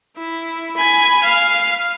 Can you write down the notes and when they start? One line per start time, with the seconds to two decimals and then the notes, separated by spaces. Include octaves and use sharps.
0.17 E4
0.77 G#5 B5
1.24 F5